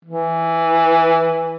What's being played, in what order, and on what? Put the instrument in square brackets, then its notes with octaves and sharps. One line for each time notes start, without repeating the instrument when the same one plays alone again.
[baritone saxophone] E3